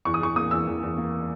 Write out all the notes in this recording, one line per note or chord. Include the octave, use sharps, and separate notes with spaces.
E2 C#6
D#6
E2 C#6
A#3 D#6
E2 E6
E2
E2
A#3